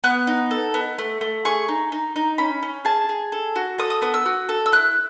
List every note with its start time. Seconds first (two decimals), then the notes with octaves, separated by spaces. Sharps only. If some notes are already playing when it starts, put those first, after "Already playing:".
0.04 B3 F#6
0.27 D#4
0.51 A4
0.74 B3
0.99 A3
1.21 A3
1.45 G#4 C#6
1.68 D#4
1.92 D#4
2.16 D#4
2.38 C#4 B5
2.63 C#4
2.85 G#4 A5
3.09 G#4
3.32 A4
3.56 F#4
3.78 A4 D#6
3.90 D#6
4.02 B3 D#6
4.14 E6
4.26 F#4
4.49 A4
4.66 E6
4.72 E4 F#6